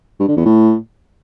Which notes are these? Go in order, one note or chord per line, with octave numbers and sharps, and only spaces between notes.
G2
D3
E2
A2